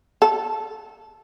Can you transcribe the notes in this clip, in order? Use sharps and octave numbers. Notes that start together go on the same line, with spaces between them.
A4